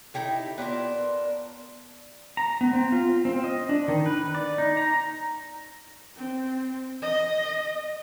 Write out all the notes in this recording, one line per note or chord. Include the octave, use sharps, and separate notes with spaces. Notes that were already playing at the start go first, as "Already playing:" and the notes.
D#4 E4 G4 A4
B3 D4 F4 A#4
A#5
B3
C4
F4
C4
D#5
D4
D#3
B4
D5
D#4
A#5
C4
D#5